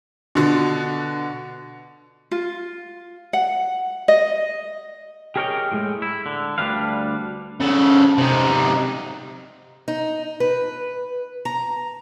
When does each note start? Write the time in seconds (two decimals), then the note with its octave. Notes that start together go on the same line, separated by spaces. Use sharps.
0.35 B2 D3 D4 F4 F#4
2.31 F4
3.33 F#5
4.08 D#5
5.36 G4 G#4 A#4 C#5 D#5 G5
5.72 A2 G#3
6.02 E4
6.26 D3
6.58 D2 A#2 G3 D4 B4 F5
7.60 C#3 A4
8.18 C3 D#4
9.88 D#4
10.40 B4
11.45 A#5